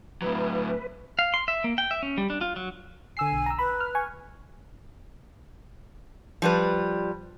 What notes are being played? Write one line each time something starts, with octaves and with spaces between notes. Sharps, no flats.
A2 F#3 B4
F5
C6
E5
A#3
G5
E5
C#4
G3
D4
F4
F#3
D3 G#5 E6 C7
B1
A#5 E6
B4 B5
F6
G#5 C#6
F3 G3 B4